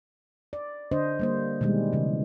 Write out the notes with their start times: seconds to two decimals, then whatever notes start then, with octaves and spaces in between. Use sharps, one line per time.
0.53 D5
0.92 D3 D4 C5 D#5
1.20 G3 A#3 C5
1.61 B2 D#3 G3 G#3
1.93 C#3 E3